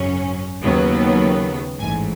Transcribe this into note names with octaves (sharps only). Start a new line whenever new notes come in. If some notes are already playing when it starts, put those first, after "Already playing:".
Already playing: G#1 F#2 C#3 F#3 C#4
D#2 C#3 F#3 B3
A1 G#2 E3 G#5